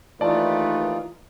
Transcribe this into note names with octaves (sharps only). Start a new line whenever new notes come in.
D#2 E3 A3 D#4 F4 B4 D5 A5